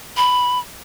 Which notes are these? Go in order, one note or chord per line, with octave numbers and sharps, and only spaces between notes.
B5